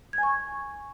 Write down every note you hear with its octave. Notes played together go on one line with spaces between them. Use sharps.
G#6
G#5
C#6